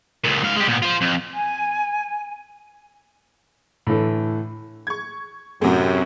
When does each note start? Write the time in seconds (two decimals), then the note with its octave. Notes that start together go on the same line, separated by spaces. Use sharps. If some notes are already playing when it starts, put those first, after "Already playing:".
0.24 C#2 A#2
0.43 G#2 F5
0.56 G#3 G4
0.68 A#2 B3
0.82 F4 C5
1.01 F2
1.34 G#5
3.87 A2 D3 E3 A4
4.87 C#6 G#6
5.62 F#2 A2 C3 F#3